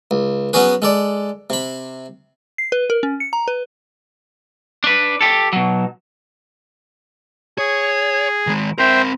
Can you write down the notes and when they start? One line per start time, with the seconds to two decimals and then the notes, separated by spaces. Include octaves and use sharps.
0.11 C#2
0.53 F#3 B3 C#4 F#4 G#4 B4
0.82 G#3 A4 D5
1.50 C3 B5
2.58 C7
2.72 B4
2.90 A#4
3.03 C#4
3.20 C#7
3.33 A#5
3.48 B4
4.84 D4 B4
5.21 G4 A4
5.53 B2 F#3
7.58 G#4 C#5
8.47 D#3 G#3
8.78 C4 A#4 C5 E5 G5